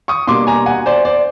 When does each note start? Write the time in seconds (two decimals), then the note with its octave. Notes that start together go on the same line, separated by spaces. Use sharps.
0.08 C#6 D#6
0.27 B2 G3 A#3 D4 C6 D6
0.47 G#5 A#5
0.66 F#5 G#5
0.86 C5 D5
1.05 C5 D5